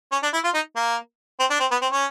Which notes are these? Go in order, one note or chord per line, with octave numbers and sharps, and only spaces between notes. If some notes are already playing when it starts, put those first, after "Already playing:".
C#4
D4
E4
F4
D#4
A#3
C4
D4
C4
B3
C4
C#4